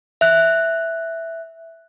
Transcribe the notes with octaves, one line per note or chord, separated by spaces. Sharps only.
E5 F#6